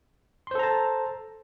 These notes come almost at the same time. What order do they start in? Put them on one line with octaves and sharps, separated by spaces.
C6 C5 A4 A#5 A5